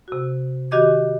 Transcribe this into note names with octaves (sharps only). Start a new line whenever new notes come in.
C3 F#4
D#3 F#4 G4 D#5 D6 G#6